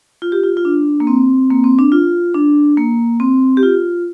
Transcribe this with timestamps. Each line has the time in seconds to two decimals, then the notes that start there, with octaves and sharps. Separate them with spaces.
0.22 F4
0.32 G4
0.44 F4
0.57 F4
0.65 D4
1.00 A#3
1.07 C4
1.50 A#3
1.64 C4
1.79 D4
1.92 F4
2.34 D4
2.78 A#3
3.20 C4
3.57 G4
3.63 F4